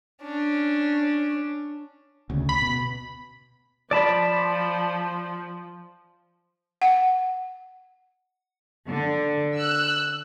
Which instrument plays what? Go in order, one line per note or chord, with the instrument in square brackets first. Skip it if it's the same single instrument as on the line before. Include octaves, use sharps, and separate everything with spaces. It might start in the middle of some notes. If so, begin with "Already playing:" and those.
[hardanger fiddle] C#4 D4
[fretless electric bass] D2 C#3
[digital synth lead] B5
[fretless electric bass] B2
[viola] F3 [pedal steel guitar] D5 A5 B5
[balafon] F#5
[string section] D3
E6 F#6